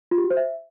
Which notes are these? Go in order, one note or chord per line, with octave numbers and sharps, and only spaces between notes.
F4
G4
F#4
C5
E5